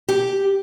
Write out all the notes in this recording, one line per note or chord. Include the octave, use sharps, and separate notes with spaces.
G4